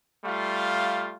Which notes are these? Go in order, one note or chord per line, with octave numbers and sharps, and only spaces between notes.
G3 A3 F4 F5